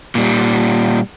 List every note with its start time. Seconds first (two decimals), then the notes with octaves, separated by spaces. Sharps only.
0.15 A#2 G3